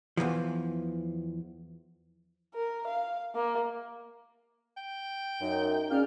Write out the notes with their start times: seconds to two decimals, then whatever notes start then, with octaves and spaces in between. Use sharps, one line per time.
0.17 E2 B2 E3 F3
2.55 A#4
2.88 F5
3.35 A#3
4.77 G5
5.41 F#2 D#4
5.91 A#3 C#4 G#4 D5 F6